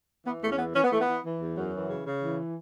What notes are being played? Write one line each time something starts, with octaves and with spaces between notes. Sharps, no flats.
E3 B3
E2 A3
C#4
E3 B3
E3 C#4
B3
E3 A3
B3
E3
E3
E2
F#2 F#3
E3
C#3
C#3
E3